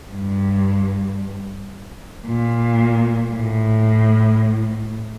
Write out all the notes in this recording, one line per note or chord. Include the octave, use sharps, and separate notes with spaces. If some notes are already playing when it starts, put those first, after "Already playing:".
G2
A#2
A2